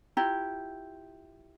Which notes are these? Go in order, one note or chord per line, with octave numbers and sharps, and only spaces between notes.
E4 F4 G4 A#5